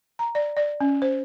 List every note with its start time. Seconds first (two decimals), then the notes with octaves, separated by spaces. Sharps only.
0.19 A#5
0.35 D5
0.57 D5
0.80 C#4
1.02 C5